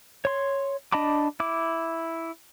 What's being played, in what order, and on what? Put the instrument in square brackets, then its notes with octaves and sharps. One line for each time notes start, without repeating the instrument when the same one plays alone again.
[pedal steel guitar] C#5 C6
D4 D#5 A5 B5 D6
E4 D6